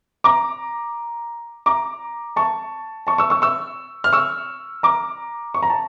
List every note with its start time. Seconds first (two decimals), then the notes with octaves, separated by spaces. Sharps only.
0.24 A#5 D6
1.66 A#5 D6
2.36 A5 C#6
3.07 A5 C#6
3.18 C#6 E6
3.30 C#6 E6
3.42 C#6 E6
4.04 F6
4.13 C#6 E6
4.83 A#5 D6
5.54 C#6
5.63 A#5
5.70 A5